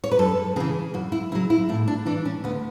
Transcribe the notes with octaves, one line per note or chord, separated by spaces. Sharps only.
C#5
B4
F#2 A4
C#3 E3 G#4
F#2 F#4
E4
C#3 F#3 E4
E4
A2 E4
D4
E3 D4
C#4
D2 B3